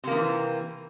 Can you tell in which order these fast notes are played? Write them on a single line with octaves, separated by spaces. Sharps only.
C3 A#3 F3 E3